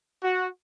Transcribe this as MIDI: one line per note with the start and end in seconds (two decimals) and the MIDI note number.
0.23 0.48 66